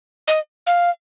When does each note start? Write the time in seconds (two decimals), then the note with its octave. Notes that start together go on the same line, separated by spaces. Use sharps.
0.28 D#5
0.67 F5